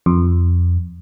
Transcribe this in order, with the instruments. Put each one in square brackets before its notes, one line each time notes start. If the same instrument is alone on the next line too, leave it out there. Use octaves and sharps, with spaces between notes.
[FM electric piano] F2